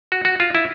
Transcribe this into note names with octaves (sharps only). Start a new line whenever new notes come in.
F#4
F#4
F4
E4